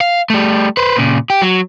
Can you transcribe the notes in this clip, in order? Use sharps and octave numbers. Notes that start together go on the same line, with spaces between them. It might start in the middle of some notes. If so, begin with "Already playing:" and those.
F5
G3 A3
B4 C5
A#2 C#3
G4
F#3